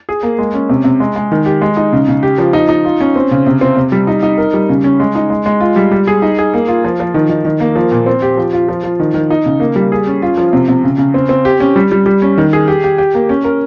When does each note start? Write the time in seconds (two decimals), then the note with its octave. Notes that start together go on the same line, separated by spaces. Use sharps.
0.09 G#4
0.23 A#3
0.39 G#3
0.54 C#4
0.69 C3
0.84 C3
1.00 G#3
1.16 G#3
1.32 D#3
1.46 G4
1.61 G#3
1.77 D#4
1.93 C#3
2.08 C#3
2.23 G4
2.38 F3
2.53 D#4
2.69 D#4
2.85 F4
3.00 C#4
3.16 C4
3.31 C#3
3.47 C3
3.61 C4
3.76 C3
3.92 G3
4.07 D#4
4.23 D#4
4.38 A#4
4.54 G3
4.69 C#3
4.84 C#4
5.00 G#3
5.15 D#4
5.30 G#3
5.46 G#3
5.60 F4
5.76 G3
5.91 G3
6.07 G#4
6.22 D#4
6.39 G#4
6.54 A#3
6.68 F4
6.84 F3
7.00 F3
7.14 D#3
7.30 D#3
7.45 D#3
7.60 A#3
7.76 F3
7.92 A#2
8.06 C4
8.22 G4
8.37 F3
8.53 F4
8.69 F3
8.84 F3
9.00 D#3
9.14 D#3
9.30 D#4
9.46 C#3
9.60 A#3
9.76 G3
9.92 G#4
10.07 C#4
10.22 F4
10.38 F3
10.53 C3
10.69 C3
10.84 C#3
10.98 C#3
11.14 C4
11.29 C4
11.45 G4
11.60 C#4
11.76 G3
11.92 G3
12.06 G3
12.22 C#4
12.38 D#3
12.53 G#4
12.68 G4
12.84 G4
12.98 G4
13.14 A#3
13.29 C#4
13.44 A#4